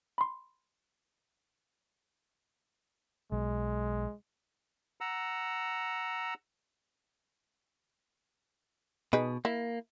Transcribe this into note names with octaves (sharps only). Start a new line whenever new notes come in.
B5 C6
B1 G#3
F#5 A#5 E6
B2 D#4 G#4 B4
A#3 E4